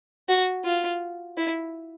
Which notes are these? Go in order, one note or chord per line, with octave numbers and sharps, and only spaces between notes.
F#4
F4
E4